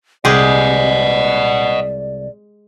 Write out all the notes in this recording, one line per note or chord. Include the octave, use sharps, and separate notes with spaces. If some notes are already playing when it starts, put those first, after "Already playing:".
C2 G#3 G4 G#4 D5 D#5 F#5